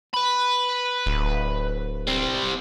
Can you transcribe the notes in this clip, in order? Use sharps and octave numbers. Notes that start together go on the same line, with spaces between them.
B4 B5
D1
G3 C4